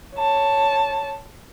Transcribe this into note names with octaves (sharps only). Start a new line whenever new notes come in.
C#5 A5